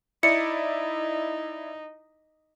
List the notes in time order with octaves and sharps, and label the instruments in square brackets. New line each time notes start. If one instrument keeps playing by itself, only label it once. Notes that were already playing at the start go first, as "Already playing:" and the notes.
[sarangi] D#4 [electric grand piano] E4 D5 [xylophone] C#7